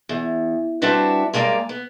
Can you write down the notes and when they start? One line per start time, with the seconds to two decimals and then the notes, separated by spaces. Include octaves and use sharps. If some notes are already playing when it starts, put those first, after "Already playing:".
0.09 E2
0.82 G3 C4 D4 E4 F#4 B4
1.33 G2 G#3 A#3 D5 A#5
1.69 B3